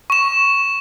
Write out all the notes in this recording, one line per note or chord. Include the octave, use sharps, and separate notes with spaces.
C#6 E7